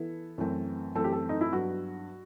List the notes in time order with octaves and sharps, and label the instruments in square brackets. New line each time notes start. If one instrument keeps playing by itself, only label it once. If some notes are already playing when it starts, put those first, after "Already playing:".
Already playing: [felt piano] E3 B3 E4 A4
F#2 E3 A3 C4
[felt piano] F#2 E3 A3 C4 [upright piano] A4
[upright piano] G4
A4
D#4
E4
[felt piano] G2 F#3 B3 [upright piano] F#4